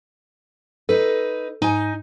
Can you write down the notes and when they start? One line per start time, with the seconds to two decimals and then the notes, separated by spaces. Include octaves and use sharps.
0.89 D#4 A4 B4
1.62 G#2 D#4 G#5